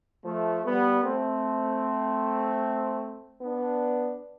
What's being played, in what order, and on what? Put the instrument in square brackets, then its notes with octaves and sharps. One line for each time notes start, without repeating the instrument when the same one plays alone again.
[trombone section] F3 A3
G3 B3
A3 C4
B3 D4